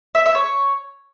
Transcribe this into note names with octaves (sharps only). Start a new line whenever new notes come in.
E5
E5
C#5